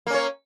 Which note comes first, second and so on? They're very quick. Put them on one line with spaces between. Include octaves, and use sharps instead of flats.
A#3 C#4 C#5